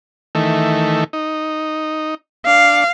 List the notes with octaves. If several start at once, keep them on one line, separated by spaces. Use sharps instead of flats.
D#3 E3 A3
D#4
D4 F5